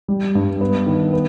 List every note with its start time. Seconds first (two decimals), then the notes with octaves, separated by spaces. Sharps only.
0.08 G3
0.35 G2
0.61 B3
0.87 D#3
1.13 B3